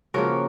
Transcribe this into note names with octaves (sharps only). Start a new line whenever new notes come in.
C#3 F3 A#3 F#4 A#4